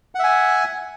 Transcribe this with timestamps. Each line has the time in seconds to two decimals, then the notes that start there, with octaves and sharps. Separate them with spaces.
0.15 F#5
0.19 E5
0.24 G#5